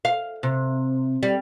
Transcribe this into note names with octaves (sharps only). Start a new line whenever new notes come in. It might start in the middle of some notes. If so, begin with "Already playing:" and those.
F5
C3
G3